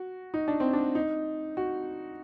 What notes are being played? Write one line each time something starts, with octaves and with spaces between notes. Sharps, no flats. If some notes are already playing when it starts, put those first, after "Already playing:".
Already playing: F#4
D#4
D4
C4
D4
D#4
F#4